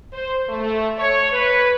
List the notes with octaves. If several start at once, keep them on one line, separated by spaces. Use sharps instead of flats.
C5
A3
C#5
B4